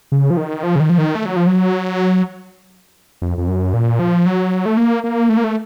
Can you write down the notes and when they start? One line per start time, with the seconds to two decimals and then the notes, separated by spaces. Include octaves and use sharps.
0.12 C#3
0.30 F3
0.37 D#3
0.63 F3
0.76 C#3
0.80 D#3
0.90 F3
0.98 D#3
1.15 A3
1.26 F#3
1.36 F3
1.47 F#3
3.22 F2
3.38 F2
3.48 F#2
3.74 A#2
3.99 F3
4.26 F#3
4.66 A3
4.77 A#3
5.04 A#3
5.29 A3
5.37 A#3
5.44 A3